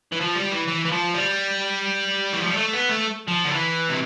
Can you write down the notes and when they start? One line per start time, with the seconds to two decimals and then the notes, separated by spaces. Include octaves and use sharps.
0.12 E3
0.20 F3
0.35 G3
0.52 E3
0.68 E3
0.85 E3
0.92 F3
1.14 G3
2.33 E3
2.41 F3
2.49 G3
2.57 A3
2.73 B3
2.89 A3
3.28 F3
3.44 D3
3.52 E3
3.89 C3